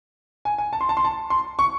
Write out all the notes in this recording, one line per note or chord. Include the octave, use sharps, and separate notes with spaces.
G#5
G#5
A5
C6
A5
C6
A5
C6
C#6